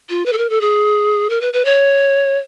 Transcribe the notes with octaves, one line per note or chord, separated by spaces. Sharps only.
F4
B4
A4
A#4
A4
G#4
A#4
B4
B4
C#5